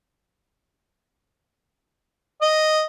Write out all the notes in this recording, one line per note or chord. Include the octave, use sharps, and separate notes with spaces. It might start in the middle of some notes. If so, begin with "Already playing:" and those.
D#5